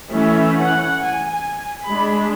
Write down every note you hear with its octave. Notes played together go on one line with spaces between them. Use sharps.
E3 A3 C#4 E5
F#5
G#5
G#5
G#3 D4 B5